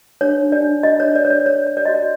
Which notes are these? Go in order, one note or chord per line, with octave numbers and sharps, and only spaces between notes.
D4 C#5
D4
D5
D4
F4 D#5
C#5
D4
D5
D4 C#5
D5
C#5
C#5
D5
F#4 D#5
D5